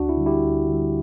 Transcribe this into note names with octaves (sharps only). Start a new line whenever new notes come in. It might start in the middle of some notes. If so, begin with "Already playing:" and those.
Already playing: D2 D4 F#4
E4
D3 G3
E4 G4
D2
D3 G3